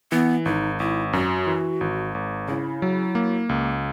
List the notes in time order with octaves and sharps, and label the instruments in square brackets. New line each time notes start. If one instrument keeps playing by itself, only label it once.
[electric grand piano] E3 [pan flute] B3
[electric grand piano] G#1 [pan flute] D#4
[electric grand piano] G#1 [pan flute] E4
[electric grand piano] F#2 [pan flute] F#4
[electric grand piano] E3
G#1
G#1
[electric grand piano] C#3 [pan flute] E4
[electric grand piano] F#3
A#3
C#2